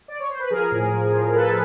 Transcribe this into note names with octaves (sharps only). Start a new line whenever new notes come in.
D5
C#5
C5
B4
F3 G#4 A#4
A2
F3
F3
F3 A4 B4